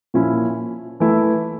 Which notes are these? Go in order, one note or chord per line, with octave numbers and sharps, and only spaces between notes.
A#2 F3 C#4 E4
E3 A3 E4